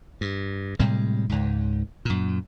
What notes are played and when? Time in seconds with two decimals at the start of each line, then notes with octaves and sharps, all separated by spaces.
0.21 G2
0.79 A2 C3 G3 G#3
1.29 C#2 G#2
2.05 F#2 A#2